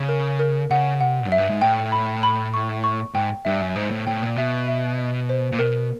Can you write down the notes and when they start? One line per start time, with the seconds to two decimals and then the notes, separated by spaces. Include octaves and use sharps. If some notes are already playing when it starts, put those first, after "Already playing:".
Already playing: C#3
0.09 A#4
0.39 A#4
0.70 C#3 F#5
1.01 C3 F#5
1.26 F#2
1.32 E5
1.38 G2
1.50 G#2
1.62 A2 G5
1.92 B5
2.23 B5
2.54 C#6
2.84 C#6
3.14 G#2 G5
3.45 G2 E5
3.61 F#2
3.76 G#2 C5
3.91 A2
4.07 A2 G5
4.22 A#2
4.37 B2 E5
4.68 E5
4.98 D#5
5.29 C5
5.52 A#2
5.59 B2 A#4